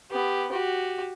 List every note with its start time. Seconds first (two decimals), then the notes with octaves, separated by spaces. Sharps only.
0.11 B3 G4
0.51 F#4 G4